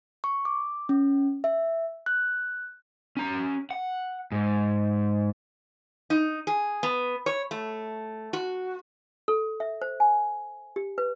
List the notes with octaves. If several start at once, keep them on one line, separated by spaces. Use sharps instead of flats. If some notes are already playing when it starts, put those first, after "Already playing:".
C#6
D6
C#4
E5
F#6
C#4 A#5
F#5
G#2
D#4
G#4
B3
C#5
A3
F#4
A4
E5
C5
G#5
G4
B4